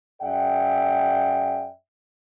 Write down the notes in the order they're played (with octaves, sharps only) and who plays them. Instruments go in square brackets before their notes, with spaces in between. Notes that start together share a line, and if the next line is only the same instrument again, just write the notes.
[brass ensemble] F#2 G#4 D5 E5 F#5 G5